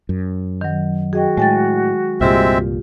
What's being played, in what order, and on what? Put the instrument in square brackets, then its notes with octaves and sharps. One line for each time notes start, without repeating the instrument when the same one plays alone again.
[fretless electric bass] F#2
[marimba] D#3 F#3
[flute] F#4 [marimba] G#4 D#5 G5
[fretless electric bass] A2 [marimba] G#3 G5 A6
[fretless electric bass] C2 G2 A#2 [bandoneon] G#3 C4 E5 [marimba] F4 G4